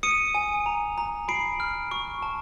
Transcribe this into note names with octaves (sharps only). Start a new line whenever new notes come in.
D#6 C#7 D#7
G#5
A#5
A#5
B5 C7 D7
F6
C#6
A5